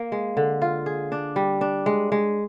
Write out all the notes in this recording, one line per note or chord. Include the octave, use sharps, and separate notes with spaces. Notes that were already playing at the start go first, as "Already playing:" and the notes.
Already playing: A#3
G#3
D3
F4
G#4
D4
G3
D4
G#3
G#3